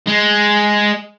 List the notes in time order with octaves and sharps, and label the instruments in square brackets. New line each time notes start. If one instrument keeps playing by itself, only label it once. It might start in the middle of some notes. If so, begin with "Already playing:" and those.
[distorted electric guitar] G#3